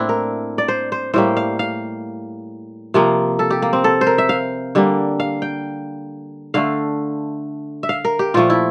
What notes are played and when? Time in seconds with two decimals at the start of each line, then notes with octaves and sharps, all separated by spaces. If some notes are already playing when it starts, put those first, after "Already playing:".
Already playing: A2 A#3 C4 D4 E4
0.09 A#4
0.58 D5
0.68 C5
0.92 C5
1.14 A2 G3 A#3 C5
1.37 F5
1.59 F5
2.94 C3 F3 A#3
3.39 A4
3.50 G4
3.62 A#3
3.73 C4
3.84 A4
4.01 C5
4.07 A#4
4.18 E5
4.29 F5
4.75 D3 G3 A#3
5.20 F5
5.42 G5
6.54 D3 A3 F5
7.83 E5
7.89 F5
8.05 A#4
8.19 G4
8.34 A#2 F3 A3 F4
8.50 E4